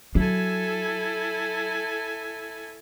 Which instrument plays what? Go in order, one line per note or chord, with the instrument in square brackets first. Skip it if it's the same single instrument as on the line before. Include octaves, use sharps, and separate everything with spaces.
[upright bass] F#3 [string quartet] E4 A4 G#5